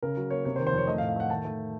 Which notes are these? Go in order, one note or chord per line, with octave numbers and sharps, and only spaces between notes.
C#3 A#4
F#3
A#3 C#5
C3 C#5
C5
D#3
C5
F2 C#5
A3 D#5
F5
A2
F5
A3 F#5
D#3 A5
A3